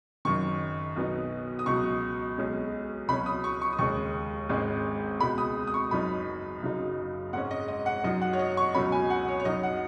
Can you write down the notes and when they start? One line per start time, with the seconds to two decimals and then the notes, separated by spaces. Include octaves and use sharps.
0.25 F#1 F#2 D#3 C#6
0.96 B1 B2 B3 D#4
1.59 D#6
1.66 C#2 B2 F#3 C#6
2.38 B1 B2 G#3 C#4
3.08 C#2 B2 F#3 C#4 B5
3.26 D#6
3.44 C#6
3.62 C#6
3.73 D#6
3.79 D#2 C#3 G#3 C#6
4.49 G#1 G#2 G#3 C#4
5.21 C#2 B2 G#3 B5
5.38 D#6
5.67 D#6
5.74 C#6
5.91 F#1 F#2 F#3 D#4 B5
6.62 F#1 F#2 C#3 F#3 D#4
7.33 G#2 G#3 C#4 F#5
7.51 D#5
7.68 D#5
7.86 F#5
8.04 F#2 F#3 D#4 D#5
8.21 F#5
8.33 C#5
8.39 D#5
8.57 C#6
8.75 C#2 B2 F#3 C#4 B5
8.92 G#5
9.10 F#5
9.28 C#5
9.40 C#5
9.45 F#2 F#3 D#4 D#5
9.63 F#5